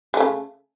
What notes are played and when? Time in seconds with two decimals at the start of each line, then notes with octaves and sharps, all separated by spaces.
0.14 G#3
0.17 A3
0.20 C#3